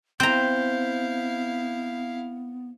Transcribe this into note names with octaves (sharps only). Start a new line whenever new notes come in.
B3 C4 E4 F5 A#5 G6